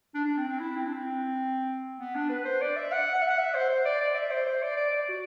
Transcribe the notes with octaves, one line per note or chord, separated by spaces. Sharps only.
D4
D4
C4
C4
E4
C4
D4
C4
B3
D4
B4
C5
D5
E5
F#5
F#5
E5
F#5
E5
C5
C5
D5
D5
E5
C5
C5
D5
D5
D5
F#4